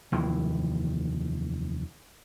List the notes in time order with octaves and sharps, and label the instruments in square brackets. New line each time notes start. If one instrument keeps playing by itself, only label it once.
[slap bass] F1 D#2 D#3 E3